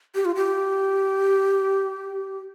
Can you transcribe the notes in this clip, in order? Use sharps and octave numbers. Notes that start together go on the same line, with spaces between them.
G4
F4
G4